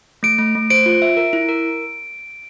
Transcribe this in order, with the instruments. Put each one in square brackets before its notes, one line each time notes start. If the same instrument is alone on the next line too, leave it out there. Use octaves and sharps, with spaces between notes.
[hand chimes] A3 [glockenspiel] D7
[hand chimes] A3
A3
[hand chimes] C5 [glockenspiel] D7
[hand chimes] F4
E5
A#4
E4
A#4